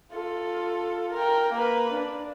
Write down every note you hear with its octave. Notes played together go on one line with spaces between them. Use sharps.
F4 A4
A#4 G5
A#3 B4
D4